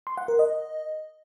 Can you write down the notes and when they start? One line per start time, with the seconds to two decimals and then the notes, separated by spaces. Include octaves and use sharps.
0.07 C6
0.18 F#5
0.28 A#4
0.39 D#5